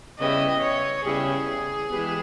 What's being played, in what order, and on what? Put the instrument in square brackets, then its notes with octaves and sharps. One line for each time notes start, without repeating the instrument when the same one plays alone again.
[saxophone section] C#3 G3 B3 E4 G4 [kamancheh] D#5
[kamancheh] C#5
[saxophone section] C#3 G3 B3 E4 G4 [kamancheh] G#4
[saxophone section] E3 G#3 B3 G4